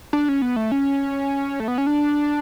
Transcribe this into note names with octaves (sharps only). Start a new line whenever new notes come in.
D4
C#4
B3
A3
C#4
A3
B3
C#4
D4